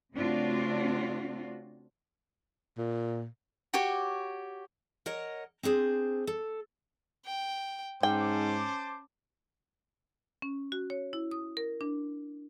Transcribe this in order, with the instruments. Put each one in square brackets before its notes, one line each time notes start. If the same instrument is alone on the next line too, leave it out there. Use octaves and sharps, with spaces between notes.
[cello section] C#3 A3 C4 D4 F4 F#4
[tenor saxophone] A#2
[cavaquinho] F#4 G4 C#5
[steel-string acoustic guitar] A#4 C#5 D#5 F#5
C4 D4 G#4 C5
A4
[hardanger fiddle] G5
[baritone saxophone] G#2 [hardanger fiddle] C#4 [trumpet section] C5 A5 D6 [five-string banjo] G5
[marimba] C#4
F#4
C#5
E4
D#6
A#4
D4